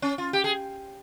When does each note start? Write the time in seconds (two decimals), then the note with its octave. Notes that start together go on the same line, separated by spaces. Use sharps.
0.02 C#4
0.18 F4
0.33 G4
0.44 G#4